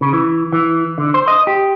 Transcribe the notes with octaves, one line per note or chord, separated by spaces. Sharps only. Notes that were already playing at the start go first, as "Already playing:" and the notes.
C#3
E3
E3
D3
C5
D#5
G4